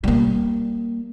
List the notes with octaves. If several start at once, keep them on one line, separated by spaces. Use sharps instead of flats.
G3 A#3